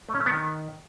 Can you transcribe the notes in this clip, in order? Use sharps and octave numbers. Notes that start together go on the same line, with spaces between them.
A3
C#4
A3
B3
D#3